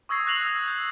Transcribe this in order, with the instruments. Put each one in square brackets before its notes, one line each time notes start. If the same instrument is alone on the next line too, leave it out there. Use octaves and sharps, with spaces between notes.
[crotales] C#6 D#6 E6 G#6 A#6 C7
F#6 A#6 C7 F7 F#7
E6
G6